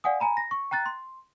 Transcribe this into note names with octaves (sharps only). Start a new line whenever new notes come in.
D5 F5 F#5 G#5 D#6
G#5 A#5 B5
A#6
C#6
G5 A#5 F#6 A6
C6